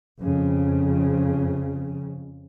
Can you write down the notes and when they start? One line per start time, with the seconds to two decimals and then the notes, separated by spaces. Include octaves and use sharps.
0.20 F2 C#3